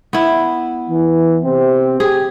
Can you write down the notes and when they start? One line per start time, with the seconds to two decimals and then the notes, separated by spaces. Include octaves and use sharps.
0.13 B3 E4
0.88 E3
1.43 C3 C4
2.00 G4 G#4